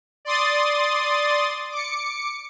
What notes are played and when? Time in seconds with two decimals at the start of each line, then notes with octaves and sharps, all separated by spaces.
0.25 D5 C6 D#6 A6
1.72 D6 C#7